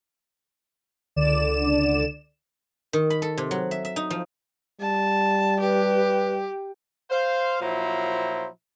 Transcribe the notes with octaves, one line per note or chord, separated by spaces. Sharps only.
C#2 D3 D5 E7
D#3
B5
A4
C3
F#3
E5
E5
D#4
F3
G3 A5
G4 B4
C5 F5
A#2 F3 F#3 E4 C5 A#5